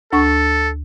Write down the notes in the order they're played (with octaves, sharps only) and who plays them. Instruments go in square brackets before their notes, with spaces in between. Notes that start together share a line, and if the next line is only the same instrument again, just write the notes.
[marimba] D2 C#6 [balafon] D4 [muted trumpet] A4